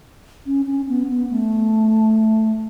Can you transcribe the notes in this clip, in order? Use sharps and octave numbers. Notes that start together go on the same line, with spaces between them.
C#4
C#4
B3
B3
A3